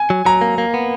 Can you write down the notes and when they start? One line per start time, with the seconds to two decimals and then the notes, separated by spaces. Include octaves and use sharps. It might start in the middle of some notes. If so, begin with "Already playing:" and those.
Already playing: G#5
0.10 F#3
0.25 F#3 A#5
0.41 A#3
0.58 A#3
0.74 B3